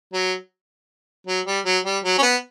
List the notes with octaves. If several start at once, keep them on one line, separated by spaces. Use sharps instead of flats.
F#3
F#3
G3
F#3
G3
F#3
C#4
B3